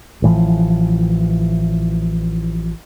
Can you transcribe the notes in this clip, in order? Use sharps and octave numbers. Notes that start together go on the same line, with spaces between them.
A1 A2 E3 F3